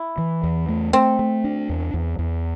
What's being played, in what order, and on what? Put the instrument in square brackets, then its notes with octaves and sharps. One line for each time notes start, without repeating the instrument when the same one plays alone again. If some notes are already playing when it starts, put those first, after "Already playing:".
Already playing: [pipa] E4
[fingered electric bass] E3
E2
A3
[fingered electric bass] A3 [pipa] C4
[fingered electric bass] A3
D4
E2
E2
E2